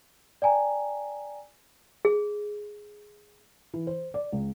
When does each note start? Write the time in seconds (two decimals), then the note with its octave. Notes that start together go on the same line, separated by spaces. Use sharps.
0.42 D5 G5 G#5 A#5
2.05 G#4
3.74 E3
3.87 C5
4.14 D5
4.32 C#2